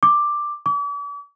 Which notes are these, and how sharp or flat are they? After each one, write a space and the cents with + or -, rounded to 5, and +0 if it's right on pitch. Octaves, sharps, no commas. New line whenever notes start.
D6 +5
D6 -45